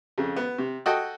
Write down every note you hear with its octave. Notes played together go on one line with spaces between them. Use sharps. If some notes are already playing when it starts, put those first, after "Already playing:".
F2 C#3
B3
C3
F#4 A4 D#5 G5